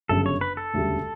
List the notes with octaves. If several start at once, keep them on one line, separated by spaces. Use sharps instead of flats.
G1 F#2 C#3 A4
C#5
B4
A4
E1 D2 C#3 G3